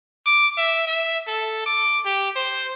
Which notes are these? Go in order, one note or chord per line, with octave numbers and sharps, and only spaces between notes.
D6
E5
E5
A4
D6
G4
C5